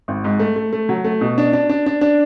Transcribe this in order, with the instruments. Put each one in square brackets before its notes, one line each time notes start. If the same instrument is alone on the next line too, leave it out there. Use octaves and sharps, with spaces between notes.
[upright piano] G#1
G#2
A3
A3
A3
F#3
A3
B2
D4
D4
D4
D4
D4